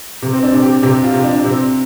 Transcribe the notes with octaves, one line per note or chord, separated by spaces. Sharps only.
C3
C4
D4
C3
G4
C3 G4
F4
C3
D4
C3 C4